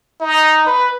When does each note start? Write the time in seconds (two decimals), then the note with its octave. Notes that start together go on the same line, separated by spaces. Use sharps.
0.21 D#4
0.66 B4